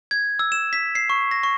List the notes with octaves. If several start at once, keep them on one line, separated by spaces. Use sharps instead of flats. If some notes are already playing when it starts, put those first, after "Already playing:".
G#6
E6
E7
B6
C7
C#6
A#6
C#6